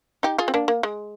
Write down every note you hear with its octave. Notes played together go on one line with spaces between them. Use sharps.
D#4 G4
F4 G#4
C4
A#3 D4
A#3
G#3